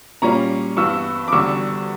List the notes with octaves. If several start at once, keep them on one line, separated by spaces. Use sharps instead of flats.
A#2 G3 A#3 C#4 A#5 C#6
G2 E3 B3 C#6 E6
D6
E2 D3 G3 C#6 E6